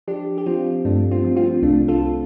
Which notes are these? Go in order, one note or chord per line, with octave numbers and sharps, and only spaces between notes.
F3 D4 G4
G4
F3 C4 F4
G2 A3 D4
C4 F4
F3
C4 F4
C2 A3 D4
F4 A4